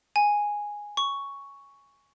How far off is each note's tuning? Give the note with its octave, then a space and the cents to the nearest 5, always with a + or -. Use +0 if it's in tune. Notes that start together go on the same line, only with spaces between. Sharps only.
G#5 -5
C#6 +5